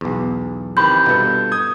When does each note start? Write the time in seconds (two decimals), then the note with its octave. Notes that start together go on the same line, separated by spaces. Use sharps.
0.01 B1 E2
0.77 C3 D#3 E3 B5 G6
1.06 G2 B2 F4 A4
1.52 D#6 G6 G#6